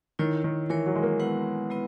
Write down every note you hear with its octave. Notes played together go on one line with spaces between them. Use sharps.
D#3 E4 A#4 C#5
D#3
E3 E4 A#4 C#5
F#3
G#3
A#3
G#3 B3 E4 B4 F#5
G#3 B3 E4 B4